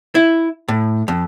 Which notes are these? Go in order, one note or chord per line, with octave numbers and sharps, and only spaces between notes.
E4
A2
F2